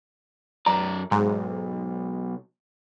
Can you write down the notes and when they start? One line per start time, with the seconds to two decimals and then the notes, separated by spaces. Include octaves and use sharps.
0.66 F#2 D5 A#5
1.11 B1 G#2